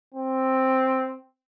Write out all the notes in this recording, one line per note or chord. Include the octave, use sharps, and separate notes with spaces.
C4